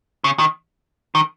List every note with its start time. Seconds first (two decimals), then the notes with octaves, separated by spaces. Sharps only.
0.24 C#3
0.39 D#3
1.15 D#3